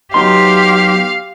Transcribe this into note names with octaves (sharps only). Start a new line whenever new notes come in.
F#3 B3 D#4 G4 F5 C6